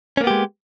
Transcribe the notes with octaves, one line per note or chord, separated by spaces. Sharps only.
G#3 A#3 B3 C#4 G4